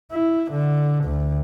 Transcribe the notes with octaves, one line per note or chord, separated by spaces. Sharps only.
E4
D3
D2